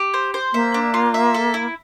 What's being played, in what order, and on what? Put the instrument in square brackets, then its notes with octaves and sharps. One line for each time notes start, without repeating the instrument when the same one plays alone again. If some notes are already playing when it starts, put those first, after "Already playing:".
Already playing: [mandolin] G4
C5
C5
[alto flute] A#3 [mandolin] E5
[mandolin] D4
F4
E5
A4
E4